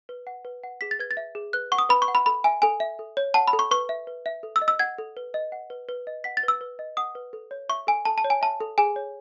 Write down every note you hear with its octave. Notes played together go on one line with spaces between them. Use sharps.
B4
F#5
B4
F#5
G#4 B6
A6
B4 G#6
A6
E5
G#4
B4 F#6
F#5 C#6
D#6
B4 B5
C#6
F#5
B5
A4 B5
E5 G#5
A4 G#5
E5
A4
C#5
F#5 A5
B5
A4
C#6
B4 C#6
E5
B4
E5
A4
E6
D#5
E6
F#5 G#6
A4
B4
D#5
F#5
B4
B4
D#5
F#5 B6
A6
B4 E6
B4
D#5
F#5 D#6
B4
A4
C#5
E5 C#6
A4 G#5
A4 A5
A5
C#5
G#5
E5 A5
A4
G#4 G#5
C#5